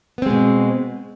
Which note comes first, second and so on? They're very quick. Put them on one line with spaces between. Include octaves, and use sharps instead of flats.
B3 C4 G#3 B2